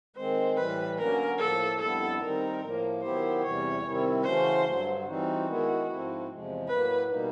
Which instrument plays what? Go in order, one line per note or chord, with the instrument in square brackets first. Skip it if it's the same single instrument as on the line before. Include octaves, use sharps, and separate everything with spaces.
[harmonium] D#3 G#3 C4 [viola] C5
[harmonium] A2 E3 G3 [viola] B4
[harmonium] D3 F#3 A#3 C#4 [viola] A#4
[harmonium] A2 F3 A#3 [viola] A4
[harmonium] F2 D3 G3 B3 E4 [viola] A4
[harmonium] D#3 G3 C4 D#4 [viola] A#4
[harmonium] A2 F3 A#3
[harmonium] D#3 F#3 B3 E4 G4 [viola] C5
[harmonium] E2 C3 E3 G3 [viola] C#5
[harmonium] C3 D#3 G3 C4 E4
[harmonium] C#3 E3 A3 C#4 F#4 [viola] C5
[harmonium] G2 D3 F#3
[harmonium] E3 G3 C4 D#4 [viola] F#4
[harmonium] D#3 G#3 B3 E4
G#2 F3 A3 C4 E4
E2 C3 F3 G#3
[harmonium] A2 F#3 A#3 [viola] B4
[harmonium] B2 G3 A#3 D#4